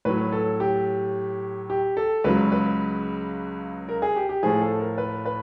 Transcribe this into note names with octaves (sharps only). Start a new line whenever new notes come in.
A2 F#3 B4
A4
G4
G4
A4
C#2 C#3 F#3 B4
B4
A#4
G#4
G4
G4
A2 F3 G#4
A4
A#4
B4
B4